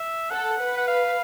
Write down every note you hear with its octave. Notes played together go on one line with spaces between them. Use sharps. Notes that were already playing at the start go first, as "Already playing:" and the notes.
Already playing: E5
A4 F#5
B4
F#5
F5